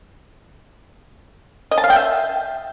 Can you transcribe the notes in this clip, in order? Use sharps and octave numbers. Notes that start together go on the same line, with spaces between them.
D#5
A5
F5
G5
E5